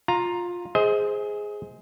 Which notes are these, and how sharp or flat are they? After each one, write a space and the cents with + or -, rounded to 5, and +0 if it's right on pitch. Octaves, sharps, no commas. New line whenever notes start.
F4 +15 A#5 +0
G#4 +0 C5 +0 D#5 +30